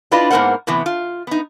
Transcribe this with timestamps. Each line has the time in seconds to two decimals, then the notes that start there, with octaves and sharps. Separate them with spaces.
0.12 D4 E4 F4 B4 D5 D#5
0.31 G#2 A#3 B3 A#4 C5 F#5
0.67 A2 C3 E3 B3
0.86 F4
1.27 B3 D#4